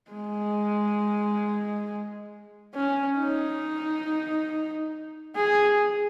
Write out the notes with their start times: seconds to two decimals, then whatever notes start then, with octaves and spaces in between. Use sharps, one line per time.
0.11 G#3
2.74 C#4
3.17 D#4
5.36 G#4